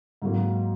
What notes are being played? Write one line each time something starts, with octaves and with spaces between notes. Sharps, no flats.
G#2 F#3 A#3